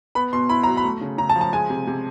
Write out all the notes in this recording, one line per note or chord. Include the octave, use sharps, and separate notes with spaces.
B3 B5
B2 C6
E4 B5
F#3 A#5
B5
A3
C#3
C#3 A#5
A5
F3
A5
G#3 G#5
C3
C3